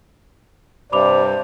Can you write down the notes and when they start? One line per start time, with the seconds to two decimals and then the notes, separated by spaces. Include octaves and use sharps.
0.92 G2 C3 C5 D5 B5 D6 F7